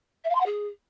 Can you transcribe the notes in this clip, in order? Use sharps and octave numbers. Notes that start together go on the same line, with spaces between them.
E5
F5
C6
F#5
G#4